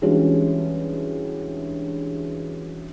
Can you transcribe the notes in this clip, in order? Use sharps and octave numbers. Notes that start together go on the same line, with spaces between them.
E3 G3 G#3 C#4 D4 F#4